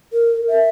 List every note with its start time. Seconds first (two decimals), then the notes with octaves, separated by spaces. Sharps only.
0.13 A#4
0.49 E5